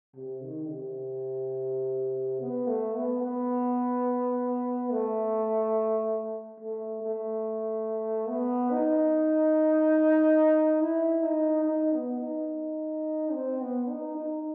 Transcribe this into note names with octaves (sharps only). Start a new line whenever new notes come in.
C3
D#3
C3
B3
A3
B3
B3
A3
A3
A3
B3
D#4
E4
D#4
D#4
B3
D#4
C4
B3
D#4
D#4